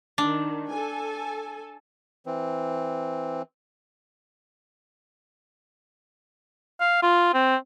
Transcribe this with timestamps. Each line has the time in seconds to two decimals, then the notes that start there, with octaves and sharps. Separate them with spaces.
0.18 D#3 D4
0.68 A4 G#5
2.26 E3 C4
6.80 F5
7.03 F4
7.34 C4